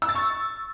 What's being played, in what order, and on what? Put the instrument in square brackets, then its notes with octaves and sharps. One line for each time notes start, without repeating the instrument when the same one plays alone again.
[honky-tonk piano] E6
A6
C#6